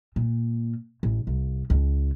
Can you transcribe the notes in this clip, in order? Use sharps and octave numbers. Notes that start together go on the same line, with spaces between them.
A#2
A1
C2
C#2